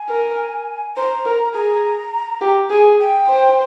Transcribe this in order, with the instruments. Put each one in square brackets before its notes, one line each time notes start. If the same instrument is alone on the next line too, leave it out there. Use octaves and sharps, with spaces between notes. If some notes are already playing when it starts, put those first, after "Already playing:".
Already playing: [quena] G#5
[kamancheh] A#4
[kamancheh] C5 [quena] A#5
[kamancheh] A#4
[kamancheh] G#4 [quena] A#5
[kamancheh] G4
[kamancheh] G#4 [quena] G#5
[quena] G5
[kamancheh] C5